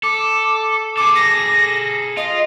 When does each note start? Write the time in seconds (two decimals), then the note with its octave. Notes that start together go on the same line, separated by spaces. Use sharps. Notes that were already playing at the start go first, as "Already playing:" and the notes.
0.03 A4 D6
0.97 G#4 A4 D6
1.15 A#6
2.17 F4 D#5